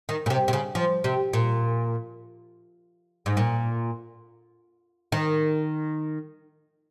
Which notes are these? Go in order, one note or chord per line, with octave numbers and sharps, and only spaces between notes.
D#3
A#2
C3
C3
C#3
F3
C3
A#2
G#2
A#2
D#3